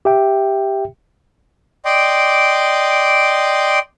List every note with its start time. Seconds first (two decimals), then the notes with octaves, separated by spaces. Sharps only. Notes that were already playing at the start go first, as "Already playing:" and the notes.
0.05 G4 E5 G5
1.85 D5 D#5 G5 C6 D6